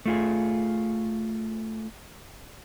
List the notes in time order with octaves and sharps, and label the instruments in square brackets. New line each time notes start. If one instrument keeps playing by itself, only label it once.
[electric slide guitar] A3 F4 G#4